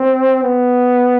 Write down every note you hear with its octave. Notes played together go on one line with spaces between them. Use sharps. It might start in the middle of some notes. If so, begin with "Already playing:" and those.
Already playing: C4
B3